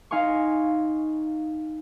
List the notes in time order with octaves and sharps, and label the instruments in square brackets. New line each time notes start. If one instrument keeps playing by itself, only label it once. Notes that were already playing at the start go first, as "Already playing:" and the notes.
[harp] D#4 F5 G#5 C6 C#6